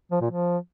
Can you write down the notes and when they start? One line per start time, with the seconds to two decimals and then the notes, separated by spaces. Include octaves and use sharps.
0.12 F3
0.21 A#2
0.31 F3